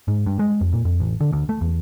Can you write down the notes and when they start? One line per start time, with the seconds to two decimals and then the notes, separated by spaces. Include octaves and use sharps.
0.08 G#2
0.26 G2
0.39 G#3
0.61 F2
0.73 A#2
0.85 F2
1.00 A1
1.21 D3
1.33 D2
1.49 A3
1.61 E2